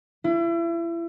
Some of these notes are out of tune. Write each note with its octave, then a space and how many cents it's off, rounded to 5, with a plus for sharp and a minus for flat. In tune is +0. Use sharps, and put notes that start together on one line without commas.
E4 +35